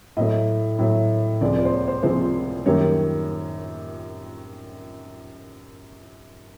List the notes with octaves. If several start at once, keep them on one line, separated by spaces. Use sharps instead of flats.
A2 F#3 A3 D#5
A2 F#3 A3
C#2 C3 F3 G#3 D5
D5
C5
C#5
C5
C#2 C3 F3 G#3 C5
F#2 D#3 G3 A#3 C#5